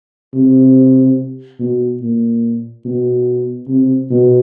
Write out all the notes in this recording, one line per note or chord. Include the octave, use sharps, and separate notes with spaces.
C3
B2
A#2
B2
C3
B2